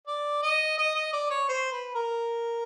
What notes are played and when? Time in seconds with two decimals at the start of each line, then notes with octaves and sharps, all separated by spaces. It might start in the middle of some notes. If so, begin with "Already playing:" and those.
0.07 D5
0.43 D#5
0.78 D#5
0.96 D#5
1.13 D5
1.31 C#5
1.49 C5
1.72 B4
1.95 A#4